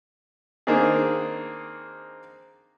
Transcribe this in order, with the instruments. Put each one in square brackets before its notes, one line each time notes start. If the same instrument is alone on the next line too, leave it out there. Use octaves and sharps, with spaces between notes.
[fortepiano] D#3 A#3 C4 D4 D#4 G#4